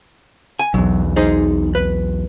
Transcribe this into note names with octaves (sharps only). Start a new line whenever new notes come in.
G#5
B1 E2 F#3
D#4 G#4 C5
B4